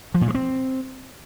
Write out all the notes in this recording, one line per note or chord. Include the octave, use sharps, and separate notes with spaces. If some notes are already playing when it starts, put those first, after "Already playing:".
F3
A#2
G#3
C4